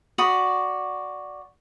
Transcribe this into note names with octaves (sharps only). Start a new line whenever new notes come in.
F#4 D5 B5 D#6